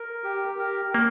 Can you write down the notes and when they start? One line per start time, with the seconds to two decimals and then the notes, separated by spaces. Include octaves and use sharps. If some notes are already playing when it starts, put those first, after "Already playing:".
Already playing: A#4
0.24 G4
0.59 A#4
0.94 A#3 A#4